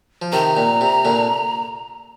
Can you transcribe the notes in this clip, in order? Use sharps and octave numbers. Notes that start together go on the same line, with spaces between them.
F3
C3 D#3 A#5
A#2
C3
A#2 D3